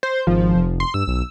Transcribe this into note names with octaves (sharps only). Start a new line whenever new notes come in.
C5
G#1 F3
F1
C6
G2 E6
B1